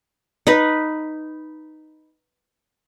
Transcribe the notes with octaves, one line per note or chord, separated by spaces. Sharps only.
D#4 B4